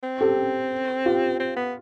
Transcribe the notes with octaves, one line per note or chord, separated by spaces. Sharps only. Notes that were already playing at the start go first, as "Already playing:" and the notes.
C4
G4 A4
F4 G4
C4
B3